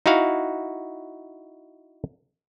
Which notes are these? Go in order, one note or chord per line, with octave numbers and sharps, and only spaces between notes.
D#4 E4 F#4 F5 F#5